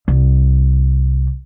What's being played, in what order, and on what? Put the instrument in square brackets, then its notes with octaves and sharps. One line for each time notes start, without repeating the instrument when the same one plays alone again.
[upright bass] C2